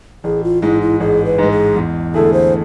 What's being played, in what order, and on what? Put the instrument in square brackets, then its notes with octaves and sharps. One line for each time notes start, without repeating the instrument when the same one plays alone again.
[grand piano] A1 [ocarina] G#4
[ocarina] F4
[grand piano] G#2 G#3 [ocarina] E4
[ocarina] E4
[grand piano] A1 [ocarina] G#4
[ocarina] B4
[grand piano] G#2 G#3
[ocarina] G#4
[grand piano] E2
[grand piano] D3 A3 E4 G#4 [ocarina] A4
[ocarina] C5